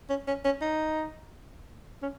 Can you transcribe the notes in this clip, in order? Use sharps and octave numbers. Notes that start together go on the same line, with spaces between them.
C#4
C#4
C#4
D#4
C#4